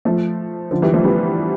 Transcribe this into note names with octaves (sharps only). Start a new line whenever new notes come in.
F3 A3
D3 F3
E3 G3
F3 A3
G3 B3